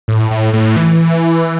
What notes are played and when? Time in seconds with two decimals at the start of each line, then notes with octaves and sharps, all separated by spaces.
0.08 A2
0.31 A2
0.53 A2
0.77 E3